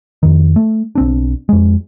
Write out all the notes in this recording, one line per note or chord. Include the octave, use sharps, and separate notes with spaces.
F2 D#3
A3
B1 C4 D4
F2 G#3